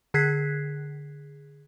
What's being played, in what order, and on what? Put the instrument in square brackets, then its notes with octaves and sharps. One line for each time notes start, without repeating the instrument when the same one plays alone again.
[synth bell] D3 G#4 F#6 G#6 B6 C7